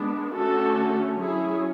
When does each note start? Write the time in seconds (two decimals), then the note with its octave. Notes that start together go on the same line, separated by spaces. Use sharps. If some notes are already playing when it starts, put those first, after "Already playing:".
Already playing: G#3 B3 D4
0.33 D3 A3 C#4 F#4 A4
1.20 F#3 C#4 E4 G#4